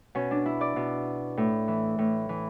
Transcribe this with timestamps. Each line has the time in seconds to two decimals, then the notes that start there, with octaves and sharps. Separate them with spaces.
0.15 B2 C#4
0.31 D4
0.46 E4
0.61 D5
0.76 B2
1.37 A2
1.68 E3
1.99 A2
2.29 E3